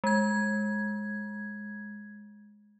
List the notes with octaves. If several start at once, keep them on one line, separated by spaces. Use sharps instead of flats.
G#3 G#6